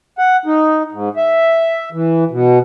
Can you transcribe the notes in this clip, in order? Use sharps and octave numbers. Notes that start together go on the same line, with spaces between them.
F#5
D#4
G#2
E5
E3
B2